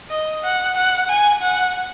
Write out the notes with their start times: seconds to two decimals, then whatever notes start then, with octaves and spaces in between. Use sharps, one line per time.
0.10 D#5
0.43 F#5
0.76 F#5
1.09 G#5
1.42 F#5